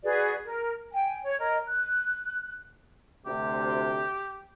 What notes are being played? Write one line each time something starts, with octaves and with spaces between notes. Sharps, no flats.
F#4 G#4 B4 D5
A#4
G5 G#5
C#5
A#4 D#5
F#6
D2 C3 G4